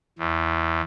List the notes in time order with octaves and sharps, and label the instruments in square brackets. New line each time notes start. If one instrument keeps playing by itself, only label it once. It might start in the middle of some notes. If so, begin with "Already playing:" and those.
[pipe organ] E2